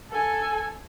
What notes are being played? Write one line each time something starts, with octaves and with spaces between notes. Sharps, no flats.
A4 G#5